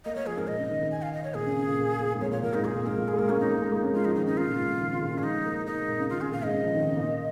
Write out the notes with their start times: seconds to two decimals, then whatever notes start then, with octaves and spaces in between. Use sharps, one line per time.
0.05 A#3 D#5
0.16 A#3 C#5
0.26 F3 G#4
0.37 G#2 A#4
0.48 A#2 D#5
0.59 C#3
0.70 D#3
0.81 D#3
0.91 G#5
1.02 F5
1.13 D#5
1.24 C#5
1.35 A#2 G#4
1.46 C#3
1.56 C#3
1.67 A#2
1.79 A#2
1.99 A#2
2.14 G#2
2.21 A#2 C#5
2.31 A#2 C#5
2.43 A#2 A#4
2.54 G#2 D#4
2.64 A#2 G#4
2.76 A#2
2.86 G#2 A#4
2.97 A#2
3.08 G#4
3.13 G#3
3.19 A#3 A#4
3.29 A#3 C#4
3.40 C#4 D#4
3.51 A#3
3.62 G#3
3.72 A#3
3.83 C#4
3.94 G#3 F4
4.05 F3 D#4
4.15 D#3 D#4
4.26 C#3 D#4
4.37 C#3 F4
4.48 A#2
4.59 G#2
4.69 A#2
4.75 F3
4.80 D#3
4.91 C#3
5.02 A#2
5.14 C#3
5.18 G#3 C#4
5.23 F3 D#4
5.34 G#3
5.45 A#3
5.67 A#3 D#4
5.78 G#3
5.89 A#2
6.00 C#3
6.10 D#3 F4
6.21 C#3 G#4
6.32 A#2 F5
6.43 G#2 D#5
6.53 C#3
6.64 F3
6.75 D#3
6.86 C#3
6.97 A#2